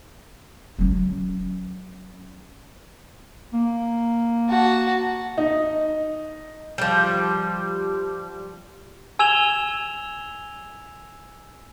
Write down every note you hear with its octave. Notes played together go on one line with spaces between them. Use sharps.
F#3 C#4
A#3
F#4 A5
D#4
F3 G3
G#5 E6 G#6 E7 F7 G7